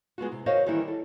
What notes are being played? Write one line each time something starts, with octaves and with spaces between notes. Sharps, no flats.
G#3 B3 F4 F#4
C3
F#4 A#4 C5 C#5 D#5 F5
D#3 E3 G3 A#3 E4
A4